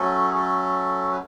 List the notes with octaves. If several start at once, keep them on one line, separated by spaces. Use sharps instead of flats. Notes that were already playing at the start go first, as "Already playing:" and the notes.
Already playing: F#3 A3 C#4 A4
G#4
A4
B4